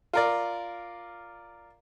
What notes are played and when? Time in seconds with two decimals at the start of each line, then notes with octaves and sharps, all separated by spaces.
0.13 F4 A#4 D5